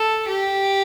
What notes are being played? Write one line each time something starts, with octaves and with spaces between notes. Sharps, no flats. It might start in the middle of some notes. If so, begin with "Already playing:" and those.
Already playing: A4
G4